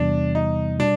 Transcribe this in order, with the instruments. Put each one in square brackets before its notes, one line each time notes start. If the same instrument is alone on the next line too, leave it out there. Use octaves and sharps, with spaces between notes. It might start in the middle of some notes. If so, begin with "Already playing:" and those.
Already playing: [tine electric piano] E2 C3 E3 G3 B3 [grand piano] D4
[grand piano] D#4
[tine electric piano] B2 G3 [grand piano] D4